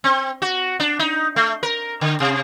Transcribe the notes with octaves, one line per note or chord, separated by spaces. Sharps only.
C4
F#4
D4
D#4
A3
A#4
D3
C3